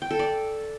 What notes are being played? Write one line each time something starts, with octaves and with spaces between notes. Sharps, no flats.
G5
A4
D5